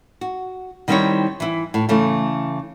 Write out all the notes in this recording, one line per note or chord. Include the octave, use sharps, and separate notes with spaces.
F#4
D#3 G3 C4 D#4 E4 C#5
E3 E4
A2
C#3 E3 A3